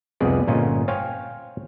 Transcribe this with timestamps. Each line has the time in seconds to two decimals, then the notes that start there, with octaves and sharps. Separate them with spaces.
0.20 C2 F2 B3 G#4 D5 D#5
0.47 G1 A#2 C#4 F4 D#5
0.88 C5 C#5 F5 G5 G#5